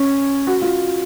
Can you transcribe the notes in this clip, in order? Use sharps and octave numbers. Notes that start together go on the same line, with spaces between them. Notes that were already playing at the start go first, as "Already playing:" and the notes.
Already playing: C#4
F#4
F4